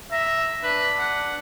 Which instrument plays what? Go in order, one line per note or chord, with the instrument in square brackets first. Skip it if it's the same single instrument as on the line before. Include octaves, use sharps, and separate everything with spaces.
[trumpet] E5 [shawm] A#5
[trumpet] D4 [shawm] B4
[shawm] F#5